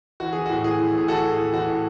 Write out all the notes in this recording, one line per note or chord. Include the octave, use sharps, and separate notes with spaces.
E3 F#4
E3 G#4
A2 F#4
E3 G#4
E3
A2 G#4
E3 F#4 A4
A2
G#4
E3
E3 F#4
A2